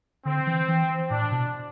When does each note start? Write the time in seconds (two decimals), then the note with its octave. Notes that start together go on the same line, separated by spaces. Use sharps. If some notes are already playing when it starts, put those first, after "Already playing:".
0.25 D3 C4
0.47 E3
0.68 E3
1.10 A2 D4
1.31 B2